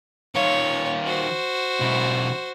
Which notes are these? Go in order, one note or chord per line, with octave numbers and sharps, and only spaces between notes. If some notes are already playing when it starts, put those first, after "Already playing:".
D#3 F4 C#5
F#4 C5
B1 E4